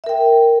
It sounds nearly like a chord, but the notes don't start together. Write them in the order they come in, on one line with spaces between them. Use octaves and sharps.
E5 A#4 G5